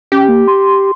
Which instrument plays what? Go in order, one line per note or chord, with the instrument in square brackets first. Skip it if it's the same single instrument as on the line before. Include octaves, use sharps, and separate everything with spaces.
[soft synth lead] C#4 [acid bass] G4
[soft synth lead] A#3
C6